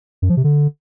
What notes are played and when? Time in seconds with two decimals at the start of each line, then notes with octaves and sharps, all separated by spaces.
0.22 F#2
0.30 F3
0.37 C3
0.44 D3